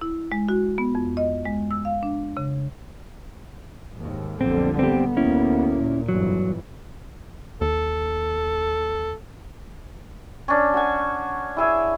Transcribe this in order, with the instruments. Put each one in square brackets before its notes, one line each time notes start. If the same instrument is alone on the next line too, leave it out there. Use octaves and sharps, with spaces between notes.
[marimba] E4
G#3
F#4
B3
F2
D#5
G#3
E6
F5
D4
C#3
[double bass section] D#2 G#2
[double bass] B1 F2 [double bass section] A#2 D3 G3 [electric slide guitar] C4
[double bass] B3 [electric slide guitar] C4 G4
[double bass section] D2 A#3 [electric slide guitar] C#4 E4
[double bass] A#2
[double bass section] G1 F2 E3 [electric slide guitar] F#3
[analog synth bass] D#2 [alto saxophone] A4
[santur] C#4 D4
F#4 G#5
E4 G#4 E5